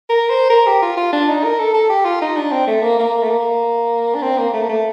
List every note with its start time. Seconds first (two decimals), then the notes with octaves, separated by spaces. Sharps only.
0.10 A#4
0.30 C5
0.50 A#4
0.67 G4
0.82 F4
0.97 F4
1.13 D4
1.29 D#4
1.44 A#4
1.59 A4
1.74 A4
1.90 G4
2.05 F4
2.22 D#4
2.37 D4
2.52 C4
2.67 A3
2.83 A#3
2.99 A#3
3.23 A3
3.30 A#3
4.15 D4
4.23 C4
4.38 A#3
4.54 A3
4.63 A#3
4.69 A3